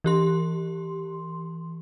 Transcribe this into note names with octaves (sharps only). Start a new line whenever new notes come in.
E3 G4 C6